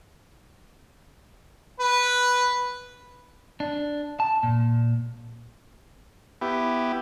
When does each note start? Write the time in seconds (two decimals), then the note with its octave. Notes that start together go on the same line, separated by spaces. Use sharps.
1.80 B4
3.60 D4
4.20 A5
4.43 A#2
6.41 B3 E4 G4